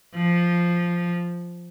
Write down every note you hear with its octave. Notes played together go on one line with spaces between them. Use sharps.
F3